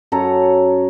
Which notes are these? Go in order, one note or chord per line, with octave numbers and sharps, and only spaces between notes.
F#2 A4 C#5 A#5